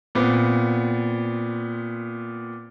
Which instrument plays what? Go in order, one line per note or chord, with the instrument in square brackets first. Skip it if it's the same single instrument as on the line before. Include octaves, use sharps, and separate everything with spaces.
[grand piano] A#2 B3 C4